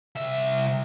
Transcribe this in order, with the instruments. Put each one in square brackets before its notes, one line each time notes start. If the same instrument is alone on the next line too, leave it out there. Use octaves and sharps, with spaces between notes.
[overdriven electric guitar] C2 E5